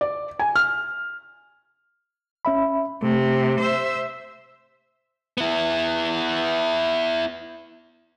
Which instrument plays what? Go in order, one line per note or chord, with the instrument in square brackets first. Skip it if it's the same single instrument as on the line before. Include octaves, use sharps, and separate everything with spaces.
[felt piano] D5
G#5
F6
[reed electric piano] C#4 E5 B5
[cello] C3 [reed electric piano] A3
[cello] C5 E5
[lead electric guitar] B3 E4